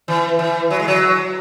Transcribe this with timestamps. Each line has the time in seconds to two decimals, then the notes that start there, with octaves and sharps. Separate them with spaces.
0.08 E3
0.39 E3
0.70 F#3
0.80 G#3
0.88 F#3